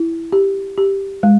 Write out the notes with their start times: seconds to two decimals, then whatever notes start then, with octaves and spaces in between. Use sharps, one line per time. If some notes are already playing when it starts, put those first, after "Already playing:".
Already playing: E4
0.33 G4
0.78 G4
1.23 G#3